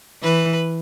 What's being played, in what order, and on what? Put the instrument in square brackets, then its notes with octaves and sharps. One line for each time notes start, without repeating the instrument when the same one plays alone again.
[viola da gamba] E3 [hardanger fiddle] B4